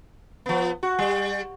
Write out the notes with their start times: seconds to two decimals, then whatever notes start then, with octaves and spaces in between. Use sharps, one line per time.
0.46 F3 B3
0.83 F#4
0.99 G3